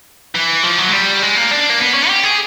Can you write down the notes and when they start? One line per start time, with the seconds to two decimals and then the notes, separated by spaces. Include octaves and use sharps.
0.35 E3
0.63 F3
0.78 F#3
0.89 G#3
0.93 G3
1.22 G#3
1.36 A#3
1.51 D4
1.70 A#3
1.79 B3
1.94 C#4
2.08 G4
2.24 G#4